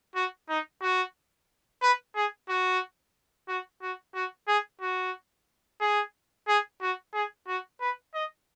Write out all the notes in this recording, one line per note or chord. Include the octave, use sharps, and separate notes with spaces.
F#4
D#4
F#4
B4
G#4
F#4
F#4
F#4
F#4
G#4
F#4
G#4
G#4
F#4
G#4
F#4
B4
D#5